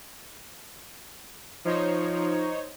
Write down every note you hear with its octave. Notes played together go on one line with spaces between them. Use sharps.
F3 D#4 C5 C#5